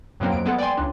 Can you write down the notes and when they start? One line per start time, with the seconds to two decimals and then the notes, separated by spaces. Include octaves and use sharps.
0.20 F#2 B2 F#3 A#3 C4
0.32 F2 D7
0.46 G#3 B3 A4
0.59 D5 G5 G#5 C6
0.77 C#2 D4